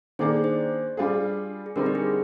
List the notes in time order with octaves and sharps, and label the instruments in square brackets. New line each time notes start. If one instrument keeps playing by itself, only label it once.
[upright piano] D#3 A#3 D4 G#4 D5 [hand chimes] C5
[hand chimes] C5
[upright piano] G3 D4 F4 G#4
[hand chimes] G#4
[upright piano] D3 G3 C4 D#4 [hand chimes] A#4
[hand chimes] G4
G#4